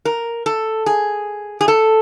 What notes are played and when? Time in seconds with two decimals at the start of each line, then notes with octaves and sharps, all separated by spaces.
0.05 A#4
0.46 A4
0.86 G#4
1.61 G#4
1.68 A4